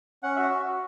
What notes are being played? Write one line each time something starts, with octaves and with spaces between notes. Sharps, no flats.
C#4 F#5
F#4 E5